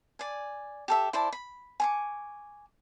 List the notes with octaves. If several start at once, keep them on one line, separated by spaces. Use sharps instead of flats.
D5 G#5
G4 A4 E5
E4 C5 D5 A5
B5
G#5 C#6 D6